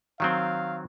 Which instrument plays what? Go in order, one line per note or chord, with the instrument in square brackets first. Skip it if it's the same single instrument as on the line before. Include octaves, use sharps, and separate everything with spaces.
[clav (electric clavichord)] D#3 F#3 C4 [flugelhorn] F5